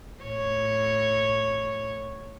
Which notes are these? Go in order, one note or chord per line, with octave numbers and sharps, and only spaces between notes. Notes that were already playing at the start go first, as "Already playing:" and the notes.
A2 C#5